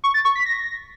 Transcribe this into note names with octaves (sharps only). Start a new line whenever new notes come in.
C#6
A6
C#6
B6
A#6